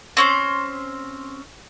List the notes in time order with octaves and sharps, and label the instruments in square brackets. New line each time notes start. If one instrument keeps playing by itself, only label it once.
[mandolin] C4 C#4 C5